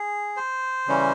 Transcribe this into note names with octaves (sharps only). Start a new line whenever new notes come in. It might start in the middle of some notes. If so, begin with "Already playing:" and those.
Already playing: G#4
C5
C#3 E3 G3 C#4